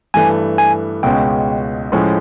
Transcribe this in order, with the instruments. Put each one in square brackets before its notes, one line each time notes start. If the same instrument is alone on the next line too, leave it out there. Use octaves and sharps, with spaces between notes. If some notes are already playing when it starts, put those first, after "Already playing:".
[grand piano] G2 E3 A3 [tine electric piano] G#5
[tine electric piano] G#5
[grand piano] C#2 B2 G#3 C#4 [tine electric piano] G5
[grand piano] A2 F3 G#3 C#4